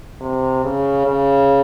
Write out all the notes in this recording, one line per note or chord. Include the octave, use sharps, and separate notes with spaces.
C3
C#3
C#3